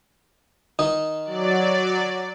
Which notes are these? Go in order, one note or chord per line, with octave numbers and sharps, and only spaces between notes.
D#3 D#4
F#3 D5